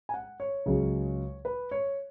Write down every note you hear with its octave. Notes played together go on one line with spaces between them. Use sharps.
G#5
F#5
C#5
C#2 C#3 F#3 C#4
B4
C#5